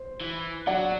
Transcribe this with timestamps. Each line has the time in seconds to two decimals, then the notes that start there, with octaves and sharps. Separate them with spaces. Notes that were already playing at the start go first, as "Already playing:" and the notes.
Already playing: C5
0.21 E3
0.67 F#3 D5 F#5